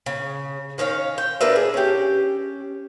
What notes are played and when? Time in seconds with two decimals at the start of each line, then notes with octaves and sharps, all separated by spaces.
0.06 C#3
0.78 D#3 C#4 C#5 F5
1.18 G5
1.41 D4 A#4 B4 E5
1.56 G#4
1.74 C#4 G4